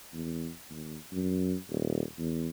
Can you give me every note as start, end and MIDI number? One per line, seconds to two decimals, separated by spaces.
0.13 0.50 40
0.69 0.97 39
1.12 1.56 42
1.70 2.02 27
2.18 2.48 40